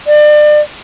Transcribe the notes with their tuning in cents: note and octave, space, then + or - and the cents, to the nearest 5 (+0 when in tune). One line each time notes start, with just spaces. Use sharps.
D5 +35